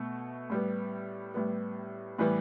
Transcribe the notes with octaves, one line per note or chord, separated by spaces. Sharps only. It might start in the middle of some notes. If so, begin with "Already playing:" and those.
Already playing: B2 A3
A2 G3 B3
A2 G3 B3
A2 E3 G3 B3 B4